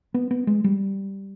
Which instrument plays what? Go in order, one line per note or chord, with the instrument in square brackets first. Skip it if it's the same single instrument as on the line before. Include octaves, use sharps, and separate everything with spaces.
[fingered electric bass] B3
B3
G#3
G3